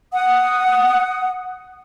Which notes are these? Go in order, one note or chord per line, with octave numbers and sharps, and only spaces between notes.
F#5 D#6